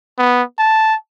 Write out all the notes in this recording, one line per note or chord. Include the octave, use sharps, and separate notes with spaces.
B3
A5